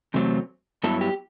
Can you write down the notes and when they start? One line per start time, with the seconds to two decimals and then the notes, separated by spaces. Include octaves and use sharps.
0.14 E2 C3 F#3 A3 C4
0.84 G2 F#3 B3 E4 A4
1.01 G4